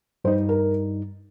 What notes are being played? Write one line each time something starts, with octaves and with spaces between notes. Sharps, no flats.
G2 G3 D#4 C5
A#4